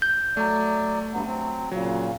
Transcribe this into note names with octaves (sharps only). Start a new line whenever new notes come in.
G6
F#3 A3 D5
G2 F#3 B3
F#3 C4
A#2 C#3 F#3